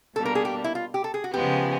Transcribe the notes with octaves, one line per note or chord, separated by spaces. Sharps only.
B2 G3 A#3 D4 A4
A#4
G#4
G4
E4
F4
G4
A4
G#4
F#4
C#3 F3 G#3 B3 G4